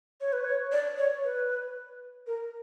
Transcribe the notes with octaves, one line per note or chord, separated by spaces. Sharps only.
C#5
B4
C#5
D5
C#5
B4
A#4